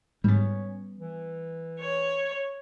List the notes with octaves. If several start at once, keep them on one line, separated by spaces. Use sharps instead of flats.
G#2 G3 B3 C#4
E3
C#5